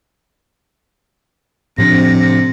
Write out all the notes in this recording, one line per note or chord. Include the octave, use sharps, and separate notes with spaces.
A2 C3 F3 D4 A#6